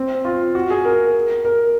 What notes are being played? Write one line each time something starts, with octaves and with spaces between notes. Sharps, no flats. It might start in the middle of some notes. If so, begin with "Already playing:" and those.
Already playing: C4
F4
F#4
G#4
A#4
A#4